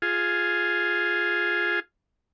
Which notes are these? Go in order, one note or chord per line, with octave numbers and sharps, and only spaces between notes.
F4 G#4